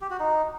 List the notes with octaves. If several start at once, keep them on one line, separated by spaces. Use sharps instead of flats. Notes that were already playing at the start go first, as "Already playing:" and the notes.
G4
F#4
D#4